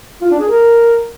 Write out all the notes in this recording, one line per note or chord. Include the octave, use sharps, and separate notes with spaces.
F4
D4
G#4
A#4